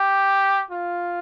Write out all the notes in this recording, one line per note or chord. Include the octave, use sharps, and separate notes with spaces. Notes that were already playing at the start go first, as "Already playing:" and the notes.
Already playing: G4
F4